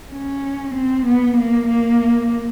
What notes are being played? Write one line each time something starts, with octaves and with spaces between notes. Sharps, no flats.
C#4
C4
B3
A#3
A#3